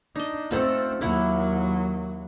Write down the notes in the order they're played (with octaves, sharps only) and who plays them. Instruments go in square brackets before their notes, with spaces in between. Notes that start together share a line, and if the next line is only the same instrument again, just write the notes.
[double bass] D4 [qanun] D#4 D#5
[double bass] A3 C4 [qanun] F4 A4 F#5
[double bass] D#2 F#3 [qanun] A#3 E4 F#5